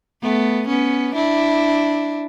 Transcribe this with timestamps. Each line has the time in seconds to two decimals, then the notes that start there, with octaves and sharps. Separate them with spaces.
0.22 A3 B3
0.68 B3 C#4
1.15 D4 E4